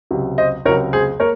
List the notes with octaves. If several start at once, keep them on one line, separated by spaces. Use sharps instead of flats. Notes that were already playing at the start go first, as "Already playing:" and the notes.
C#2 C3 F#3
C5 D#5
C#2 C3 F#3 A#4 C#5
G#4 C5
A#3 A#4 C#5